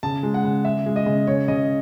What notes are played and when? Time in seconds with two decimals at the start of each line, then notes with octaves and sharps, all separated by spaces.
0.03 C#3 A5
0.23 G#3
0.34 F#5
0.44 C#3
0.65 C#3 E5
0.86 G#3
0.96 D#5
1.06 C#3
1.27 C#3 C#5
1.48 C#3 D#5